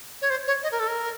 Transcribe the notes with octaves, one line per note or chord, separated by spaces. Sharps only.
C#5
C5
C#5
D#5
A#4
A4
A#4